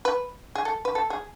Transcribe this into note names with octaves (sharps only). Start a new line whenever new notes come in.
B4
G#4
A4
B4
A4
G#4